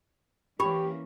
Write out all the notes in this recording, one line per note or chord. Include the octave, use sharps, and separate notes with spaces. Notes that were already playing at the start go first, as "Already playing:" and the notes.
E3 A#3 C#4 G4 C#5 B5